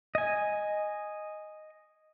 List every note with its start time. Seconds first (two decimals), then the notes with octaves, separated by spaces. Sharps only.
0.15 D#5 G#5